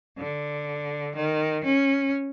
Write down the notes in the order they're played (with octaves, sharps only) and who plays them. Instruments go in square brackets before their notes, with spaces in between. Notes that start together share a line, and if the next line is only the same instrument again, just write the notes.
[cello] D3
D#3
C#4